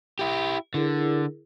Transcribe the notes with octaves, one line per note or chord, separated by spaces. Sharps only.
E4 G4
D3 E4 G#4 A#4